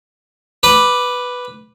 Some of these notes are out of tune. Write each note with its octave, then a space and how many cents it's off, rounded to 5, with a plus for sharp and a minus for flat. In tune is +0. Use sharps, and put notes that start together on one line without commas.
B4 +0 D6 +0